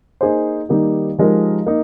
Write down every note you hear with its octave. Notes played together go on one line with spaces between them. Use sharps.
A#3 D#4 G#4 C5
D#3 G3 A#3 D#4 G4
F3 G#3 D#4 G4 A#4
A#3 D#4